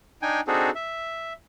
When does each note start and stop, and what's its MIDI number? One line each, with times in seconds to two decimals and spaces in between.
0.22 0.41 62
0.22 0.41 63
0.22 0.41 79
0.22 0.41 80
0.47 0.70 60
0.47 0.70 62
0.47 0.70 63
0.47 0.70 66
0.47 0.70 68
0.47 0.70 69
0.75 1.33 76